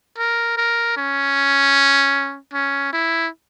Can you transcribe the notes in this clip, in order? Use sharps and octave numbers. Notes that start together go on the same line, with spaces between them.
A#4
A#4
C#4
C#4
E4